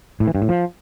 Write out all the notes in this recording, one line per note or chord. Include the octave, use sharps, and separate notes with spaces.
A2
E3
G2
A2
F3